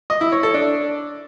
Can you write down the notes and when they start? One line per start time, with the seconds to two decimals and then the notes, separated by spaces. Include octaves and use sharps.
0.10 D#5
0.21 E4
0.32 C#5
0.43 A4
0.54 D4